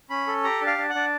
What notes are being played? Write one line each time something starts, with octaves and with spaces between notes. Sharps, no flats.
C#4 B5
A4
G4 A#5
D4
F5
D4
F#5
D4